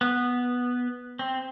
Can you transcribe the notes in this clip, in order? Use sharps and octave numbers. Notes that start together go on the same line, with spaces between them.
B3
C4